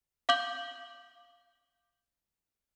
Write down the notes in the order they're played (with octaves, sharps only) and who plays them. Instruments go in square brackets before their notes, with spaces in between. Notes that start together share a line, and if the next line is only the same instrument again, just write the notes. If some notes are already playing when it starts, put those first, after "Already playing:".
[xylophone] F5 D6 G6 F#7